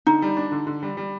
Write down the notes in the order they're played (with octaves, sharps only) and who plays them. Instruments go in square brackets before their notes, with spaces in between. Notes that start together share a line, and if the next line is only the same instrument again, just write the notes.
[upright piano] D3 [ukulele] D#4
[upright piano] G3
D4
D3
D3
G3
G3